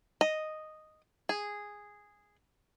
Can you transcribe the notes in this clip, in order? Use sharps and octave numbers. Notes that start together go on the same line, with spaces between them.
D#5
G#4